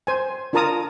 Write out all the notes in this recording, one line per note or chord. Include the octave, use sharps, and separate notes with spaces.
C5 G#5
D4 F4 A#4 A5 A#5 D#6